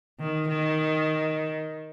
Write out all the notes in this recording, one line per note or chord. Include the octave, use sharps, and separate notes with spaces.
D#3
D#3